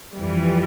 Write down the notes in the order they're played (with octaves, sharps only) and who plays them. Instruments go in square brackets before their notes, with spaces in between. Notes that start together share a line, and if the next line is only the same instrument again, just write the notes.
[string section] F2 E3 G3